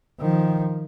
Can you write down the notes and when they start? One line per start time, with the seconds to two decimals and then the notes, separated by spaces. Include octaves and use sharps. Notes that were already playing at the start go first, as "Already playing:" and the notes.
0.20 D#3 F3